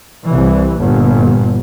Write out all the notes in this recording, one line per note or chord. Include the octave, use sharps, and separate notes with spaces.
C2 E3
G1 A#2